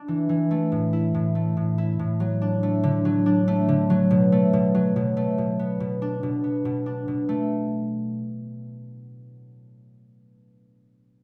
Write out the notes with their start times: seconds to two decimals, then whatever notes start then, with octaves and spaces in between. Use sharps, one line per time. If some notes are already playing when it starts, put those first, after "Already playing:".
Already playing: D4
0.08 E3
0.29 E3
0.51 A3
0.72 A2
0.93 E4
1.14 A2
1.35 A3
1.57 A2
1.78 E4
1.99 A2
2.20 F#3
2.42 D4
2.63 A3
2.83 D3
3.05 F#3
3.26 D4
3.48 A3
3.68 D3
3.90 F#3
4.11 B2
4.32 A3
4.53 B2
4.75 F#3
4.96 B2
5.17 A3
5.38 B2
5.59 B3
5.80 B2
6.02 D4
6.23 B2
6.44 B3
6.65 B2
6.86 D4
7.08 B2
7.29 A3